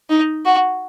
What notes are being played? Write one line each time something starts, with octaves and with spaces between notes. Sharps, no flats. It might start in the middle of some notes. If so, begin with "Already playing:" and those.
D#4
F#4